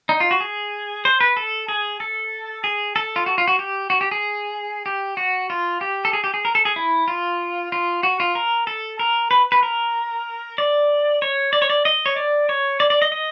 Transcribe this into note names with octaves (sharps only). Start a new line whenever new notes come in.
D#4
F4
F#4
G#4
C5
B4
A4
G#4
A4
G#4
A4
F4
F#4
F4
F#4
G4
F#4
G4
G#4
G4
F#4
F4
G4
A4
G#4
G4
G#4
A#4
A4
G#4
E4
F4
F4
F#4
F4
A#4
A4
A#4
B4
B4
A#4
D5
C#5
D5
C#5
D5
D#5
C#5
D5
C#5
D5
D5
D#5
D#5